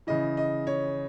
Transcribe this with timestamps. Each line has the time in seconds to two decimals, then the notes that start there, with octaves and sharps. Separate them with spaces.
0.07 C#3 E3 D#5
0.37 D#5
0.67 C#5